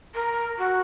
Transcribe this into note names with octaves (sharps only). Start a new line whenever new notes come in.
A#4
F#4